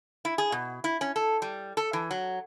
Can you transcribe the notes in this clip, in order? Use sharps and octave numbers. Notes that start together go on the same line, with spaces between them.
E4
G#4
B2
E4
C#4
A4
G3
A4
E3
F#3